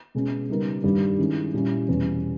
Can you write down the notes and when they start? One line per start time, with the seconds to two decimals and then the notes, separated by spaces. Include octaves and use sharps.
0.15 B2 G#3 C#4
0.49 C#3 G3 B3 D#4 A#4
0.84 G2 D#3 G3
1.19 D#3 G#3 C#4 E4
1.54 A#2 G3 C#4 E4
1.88 E2 B2 G3 C#4